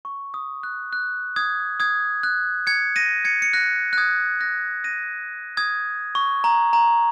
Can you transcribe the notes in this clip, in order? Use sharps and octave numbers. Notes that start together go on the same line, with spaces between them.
C#6
D#6
F#6
F#6
D#6 G#6
D#6 G#6
F#6
G#6 C#7
A#6 D#7
G#6 C#7
C#7
F#6 A#6
F#6
D#6 G#6
F#6 A#6
A#6 D#7
D#6 G#6
C#6
A#5
A#5